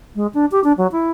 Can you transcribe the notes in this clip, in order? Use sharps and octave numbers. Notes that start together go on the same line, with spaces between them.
G#3
D4
G4
D4
F#3
E4